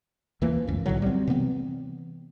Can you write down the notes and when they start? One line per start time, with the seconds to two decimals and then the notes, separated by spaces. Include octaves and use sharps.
0.42 D#2 E3 F3 A#3
0.67 C#2 F#2
0.86 B1 A2 D3 F#3
1.02 G3 C4
1.27 C3 E3 B3 C4